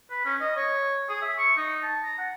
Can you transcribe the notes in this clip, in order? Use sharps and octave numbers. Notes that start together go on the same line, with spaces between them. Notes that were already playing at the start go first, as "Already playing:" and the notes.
B4
C#4
D#5
C#5
G#4
E5
C#6
D#4
A5
A#5
F#5